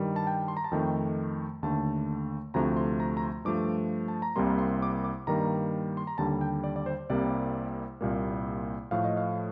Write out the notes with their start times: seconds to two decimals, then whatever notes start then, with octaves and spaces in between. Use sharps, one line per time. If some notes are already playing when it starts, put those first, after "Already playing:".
Already playing: G2 D#3 G3
0.16 A5
0.27 G5
0.48 C6
0.57 A#5
0.64 A5
0.71 F2 D#3 A3 G5
1.63 D#2 D3 A3 A5
2.54 D2 C3 F3 A3 A#5
2.77 C6
3.00 A#5
3.17 A#5
3.23 C6
3.45 G2 F3 A3 D6
4.08 A5
4.22 A#5
4.36 C2 C3 G3 A#3 C6
4.58 C6
4.82 D6
5.04 D6
5.27 G2 D#3 G3 A#3 A#5
5.97 C6
6.07 A#5
6.18 D#2 D3 G3 A5
6.41 G5
6.64 D5
6.76 D5
6.86 C5
7.10 C2 C3 G3 A#3 D5
8.01 C2 A#2 G3 A#3
8.91 A2 F3 A3 F5
9.04 D#5
9.17 F5